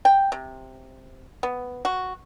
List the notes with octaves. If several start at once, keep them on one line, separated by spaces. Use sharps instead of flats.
G5
C3
B3
F#4